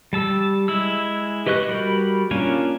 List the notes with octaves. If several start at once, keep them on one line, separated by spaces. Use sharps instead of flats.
G3 A5 E6
G#3 E4 E6
G4 B4 D#5 C#6 F#6
G3 F#4 A#4 B5 G6
A#3 C#4 D4 F4 G#5